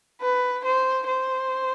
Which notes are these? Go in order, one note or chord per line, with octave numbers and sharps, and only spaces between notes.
B4
C5
C5